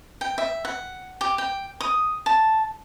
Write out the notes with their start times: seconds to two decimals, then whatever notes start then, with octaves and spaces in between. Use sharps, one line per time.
0.21 G5
0.38 E5
0.65 F#5
1.21 G4
1.38 G5
1.81 D#6
2.26 A5